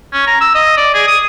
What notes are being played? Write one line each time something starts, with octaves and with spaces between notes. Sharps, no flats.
C#4
A#5
E6
D#5
D5
G#4
D#6